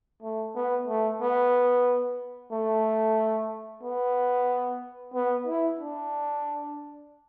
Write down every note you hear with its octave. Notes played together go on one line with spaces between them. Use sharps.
A3
B3
A3
B3
A3
B3
B3
E4
D4